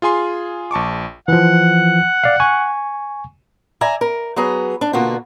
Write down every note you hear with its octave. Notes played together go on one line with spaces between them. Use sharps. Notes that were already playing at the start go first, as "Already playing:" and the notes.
F4 G#4 G#5 C6
A#1 A5 C#6 D6
E3 F3 F#5
D5 F5
G#5 C#6
D5 E5 G#5 A#5
A#4
F#3 B3 G#4 A#5
D4
B2 D3 A#3 F4 F#4